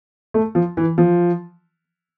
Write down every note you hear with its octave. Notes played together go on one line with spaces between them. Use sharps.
A3
F3
E3
F3